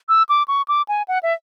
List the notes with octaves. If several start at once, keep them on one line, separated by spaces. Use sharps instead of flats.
E6
D6
C#6
D6
G#5
F#5
E5